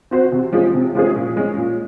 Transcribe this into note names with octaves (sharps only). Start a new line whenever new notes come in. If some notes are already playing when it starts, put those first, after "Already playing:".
C4 F#4 C5
C3
F3 G#3 C#4 G#4
C3
F3 G#3 C#4 G#4
A#2
G#3 C#4
A#2